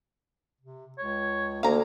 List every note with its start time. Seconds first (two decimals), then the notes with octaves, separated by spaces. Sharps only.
0.61 C3
0.98 C#2 C#5
1.63 D2 A#3 F5 A#5